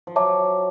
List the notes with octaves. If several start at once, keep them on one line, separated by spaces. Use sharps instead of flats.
F3
F#3 C#5 E5 A5 D6